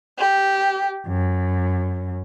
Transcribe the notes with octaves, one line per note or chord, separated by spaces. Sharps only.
G4
F#2